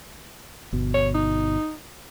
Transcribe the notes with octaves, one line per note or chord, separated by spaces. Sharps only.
G1 B2
C#5
D#4